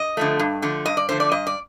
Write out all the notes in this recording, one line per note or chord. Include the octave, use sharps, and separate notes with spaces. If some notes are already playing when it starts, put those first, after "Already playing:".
Already playing: D#5
D3 F3 A3
G2
D3 F3 A3
G2 D#5
D5
D3 F3 A3 C5
D5
G2 D#5
D5